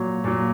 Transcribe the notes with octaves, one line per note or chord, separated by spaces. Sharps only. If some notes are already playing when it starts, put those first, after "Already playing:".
Already playing: A#2 F#3 C#5
A#2 F#3